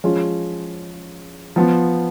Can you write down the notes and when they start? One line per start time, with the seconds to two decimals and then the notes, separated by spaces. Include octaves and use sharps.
0.04 F3 G#3 C#4 F4
1.56 F3 B3 F4